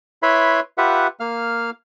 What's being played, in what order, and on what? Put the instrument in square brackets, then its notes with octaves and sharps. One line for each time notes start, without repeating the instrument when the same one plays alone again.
[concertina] E4 B4 C#5 E5 B5 C6
F4 G4 B4 E5 F#5
A#3 F5 F6